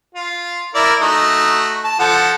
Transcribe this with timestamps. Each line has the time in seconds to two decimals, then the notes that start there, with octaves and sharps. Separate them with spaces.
0.15 F4
0.75 E4 A#4 D5
1.01 A3 D#4 F#4
1.84 A5
1.99 F3 A4 F#5